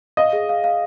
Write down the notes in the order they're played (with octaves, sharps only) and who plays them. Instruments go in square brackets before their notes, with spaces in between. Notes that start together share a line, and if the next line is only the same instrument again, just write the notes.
[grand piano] D#5 [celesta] F5
[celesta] G#4
F5
F5